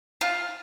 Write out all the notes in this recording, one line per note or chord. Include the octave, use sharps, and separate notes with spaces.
F4